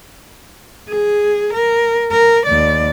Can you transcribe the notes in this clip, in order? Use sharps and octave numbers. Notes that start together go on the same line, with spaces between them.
G#4
A#4
A#4
D#2 D5